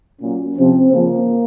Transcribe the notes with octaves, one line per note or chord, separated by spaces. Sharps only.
A#2 F#3 C#4
C3 F3 C4
C#3 F3 A#3